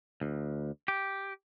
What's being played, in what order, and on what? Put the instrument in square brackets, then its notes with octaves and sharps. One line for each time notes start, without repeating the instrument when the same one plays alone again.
[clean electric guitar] D2
G4